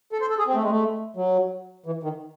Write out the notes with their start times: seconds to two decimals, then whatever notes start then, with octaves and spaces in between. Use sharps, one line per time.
0.12 A4
0.21 C5
0.30 A4
0.39 G#4
0.47 C4
0.55 A3
0.63 G#3
0.70 A3
1.17 F#3
1.86 E3
2.03 D#3